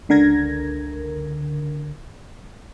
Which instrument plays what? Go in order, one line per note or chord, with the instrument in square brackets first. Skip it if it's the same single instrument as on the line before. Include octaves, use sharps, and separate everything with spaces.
[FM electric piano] C#2 D3 A#4 G#6 A#6